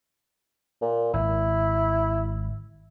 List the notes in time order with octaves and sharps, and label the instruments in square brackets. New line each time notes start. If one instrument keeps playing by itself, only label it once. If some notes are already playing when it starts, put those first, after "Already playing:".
[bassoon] A#2
[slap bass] G#1 [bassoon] E4